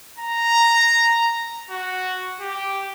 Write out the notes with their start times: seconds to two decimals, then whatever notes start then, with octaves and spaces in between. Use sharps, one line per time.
0.19 A#5
1.71 F#4
2.40 G4